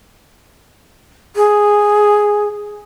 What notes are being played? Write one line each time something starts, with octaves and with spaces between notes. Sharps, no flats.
G#4